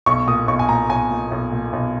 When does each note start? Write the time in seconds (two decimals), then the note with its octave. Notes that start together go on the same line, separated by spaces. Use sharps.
0.06 B1 C#6
0.27 A#2 D#6
0.48 B1 C#6
0.59 G#5
0.69 A#2 A#5
0.89 B1 G#5
1.10 A#2
1.31 B1
1.52 A#2
1.73 B1